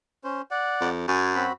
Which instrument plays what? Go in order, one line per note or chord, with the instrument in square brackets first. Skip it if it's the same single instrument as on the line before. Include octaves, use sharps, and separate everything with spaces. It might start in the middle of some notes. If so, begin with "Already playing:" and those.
[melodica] C#4 C5
D5 F#5
[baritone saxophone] F2
[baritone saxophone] F#2 [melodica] G#5
[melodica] C4 F#4 B5